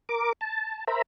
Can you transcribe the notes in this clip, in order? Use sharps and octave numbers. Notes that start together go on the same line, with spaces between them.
A#4 D6
A5
A#4 C5 E5 A#5 B5